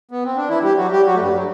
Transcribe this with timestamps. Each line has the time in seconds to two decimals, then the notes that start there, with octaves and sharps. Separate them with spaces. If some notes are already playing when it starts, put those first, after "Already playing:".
0.11 B3
0.25 C4
0.37 D4
0.49 E3 E4
0.63 G3 G4
0.77 F#3 F#4
0.92 G3 G4
1.05 F#3 F#4
1.15 A3
1.19 G2 G3
1.34 F#3